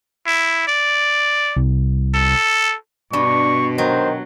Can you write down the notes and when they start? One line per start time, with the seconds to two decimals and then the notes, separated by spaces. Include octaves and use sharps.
0.27 E4
0.67 D5
1.56 C2
2.14 A4
3.13 G2 B2 D4 C#6
3.78 D#3 F#3 C5